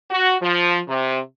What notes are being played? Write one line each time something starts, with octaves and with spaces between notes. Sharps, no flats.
F#4
F3
C3